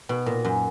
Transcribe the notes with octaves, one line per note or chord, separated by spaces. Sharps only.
B2
A#2
F#2